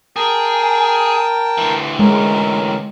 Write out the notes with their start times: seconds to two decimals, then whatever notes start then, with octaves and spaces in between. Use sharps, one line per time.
0.16 G#4 A#4 G5 A5
1.58 D2 E3
1.99 G#3 C#4 A#4